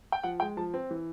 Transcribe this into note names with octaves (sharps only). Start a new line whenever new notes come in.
G5
F3 F#5
G#3 G5
F3 A5
C4
E3